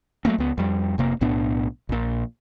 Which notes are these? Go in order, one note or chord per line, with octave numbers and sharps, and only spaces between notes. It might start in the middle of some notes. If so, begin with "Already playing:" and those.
F#3 A3 A#3 C4
C#2 B3
F2 G3
F1 C3 A#3
B1 A2 B3 D4
A#1 A#2